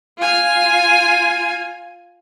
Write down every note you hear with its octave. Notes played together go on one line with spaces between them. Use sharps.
F4 G#5